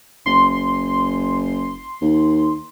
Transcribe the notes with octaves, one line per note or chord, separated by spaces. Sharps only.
F#1 C6
D#2